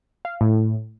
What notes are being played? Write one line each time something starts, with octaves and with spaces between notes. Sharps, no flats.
F5
A2